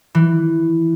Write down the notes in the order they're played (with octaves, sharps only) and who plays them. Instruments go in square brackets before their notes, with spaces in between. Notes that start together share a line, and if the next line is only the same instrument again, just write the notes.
[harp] E3